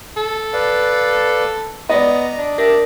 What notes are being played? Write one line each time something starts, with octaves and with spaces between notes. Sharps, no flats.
A4
B4 D5 F5
B3 D5 D#5 A#5
D4
D4 G4 A#4 E5